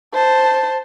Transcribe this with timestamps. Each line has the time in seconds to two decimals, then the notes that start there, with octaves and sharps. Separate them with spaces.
0.14 C5 A5